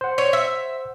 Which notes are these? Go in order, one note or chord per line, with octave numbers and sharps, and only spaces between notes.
C5 F#5
C#5
E5